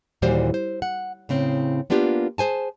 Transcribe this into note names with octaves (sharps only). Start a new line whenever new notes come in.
D#2 A#2 E3 G3 F#4 C5
C5
F#5
A2 C#3 C4
A#3 B3 D4 F4 G4
G#4 C5 G#5 A5